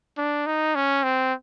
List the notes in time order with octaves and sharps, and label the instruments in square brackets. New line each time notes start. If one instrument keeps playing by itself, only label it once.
[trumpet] D4
D#4
C#4
C4